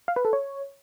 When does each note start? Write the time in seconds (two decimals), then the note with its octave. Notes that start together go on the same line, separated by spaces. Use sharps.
0.08 F5
0.16 B4
0.25 A4
0.33 C#5